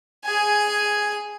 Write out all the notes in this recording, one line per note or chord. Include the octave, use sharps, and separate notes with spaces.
G#4 G#5